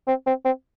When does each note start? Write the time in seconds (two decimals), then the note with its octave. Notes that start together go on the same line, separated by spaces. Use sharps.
0.08 C4
0.27 C4
0.45 C4